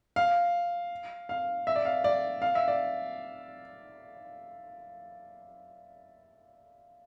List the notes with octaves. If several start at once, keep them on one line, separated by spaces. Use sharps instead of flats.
F5
F5
E5
D5
F5
D5
F5
E5
D5